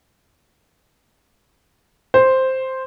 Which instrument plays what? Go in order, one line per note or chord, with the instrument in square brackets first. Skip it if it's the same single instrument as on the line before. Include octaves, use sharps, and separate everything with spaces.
[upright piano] C5